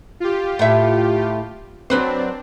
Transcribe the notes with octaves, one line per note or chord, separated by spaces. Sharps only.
F4 G4
A2 E5
F#3 C4 D4 B4 C5